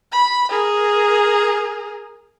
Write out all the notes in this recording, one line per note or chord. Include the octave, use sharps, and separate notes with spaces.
B5
G#4 A#4